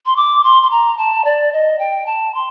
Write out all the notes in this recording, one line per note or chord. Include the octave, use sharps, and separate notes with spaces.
C6
D6
C6
C6
A#5
A5
D5
D#5
G5
A5
C6